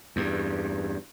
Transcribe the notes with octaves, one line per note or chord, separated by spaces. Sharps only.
E2 G2